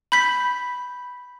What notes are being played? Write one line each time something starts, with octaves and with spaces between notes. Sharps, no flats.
B5 G6 B6